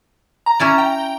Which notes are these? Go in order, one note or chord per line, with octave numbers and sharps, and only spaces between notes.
A#5
C#4 E4 D5
G5